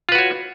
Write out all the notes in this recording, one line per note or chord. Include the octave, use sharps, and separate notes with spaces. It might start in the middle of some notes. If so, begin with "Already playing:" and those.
F4 F#4 B4 C#5